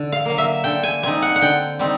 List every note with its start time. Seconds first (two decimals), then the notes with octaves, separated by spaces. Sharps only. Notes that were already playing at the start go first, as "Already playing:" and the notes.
Already playing: D3
0.12 F5
0.25 F#3 A#3
0.38 E5
0.64 D3 G5
0.83 G#5
1.03 G3 C4 D#4 G#5
1.22 F#5
1.36 F#5
1.41 D3 G5
1.79 G3 C4 D#4